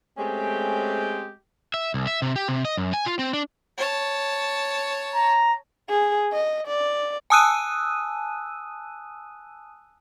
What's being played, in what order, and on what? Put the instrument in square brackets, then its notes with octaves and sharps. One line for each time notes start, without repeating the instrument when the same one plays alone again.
[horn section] G#3 A3 C4 C#4 G4
[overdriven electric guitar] E5
C2
E5
C3
G4
C3
D#5
F#2
G#5
F4
C4
D4
[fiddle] C#5 A5
[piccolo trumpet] A#5
[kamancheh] G#4
D#5
D5
[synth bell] G#5 A5 D#6 E6 F#6 D#7